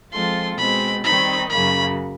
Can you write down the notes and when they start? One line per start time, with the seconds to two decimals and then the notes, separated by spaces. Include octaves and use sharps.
0.12 F3 G#3 C4 F4 A4 C6
0.58 B2 G#3 C4 B5
1.04 D#3 G3 C4 D#4 B5
1.50 F#2 C#3 F#3 A#3 B5